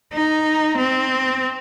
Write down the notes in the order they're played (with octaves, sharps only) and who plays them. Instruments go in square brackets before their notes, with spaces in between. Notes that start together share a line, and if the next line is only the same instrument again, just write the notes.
[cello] D#4
C4